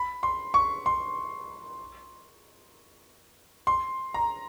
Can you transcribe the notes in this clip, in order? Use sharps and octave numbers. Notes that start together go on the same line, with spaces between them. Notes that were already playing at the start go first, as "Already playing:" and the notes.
Already playing: B5
C6
C#6
C6
C6
A#5